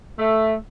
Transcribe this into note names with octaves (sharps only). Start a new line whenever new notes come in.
A3